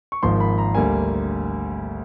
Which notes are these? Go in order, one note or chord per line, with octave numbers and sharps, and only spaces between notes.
C#6
G#1 G#2 F3 A#3 C6
B5
A#5
D2 D3 G3 A#3 G#5